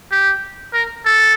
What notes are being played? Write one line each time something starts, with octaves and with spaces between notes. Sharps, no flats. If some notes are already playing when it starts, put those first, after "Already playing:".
G4
A#4
A4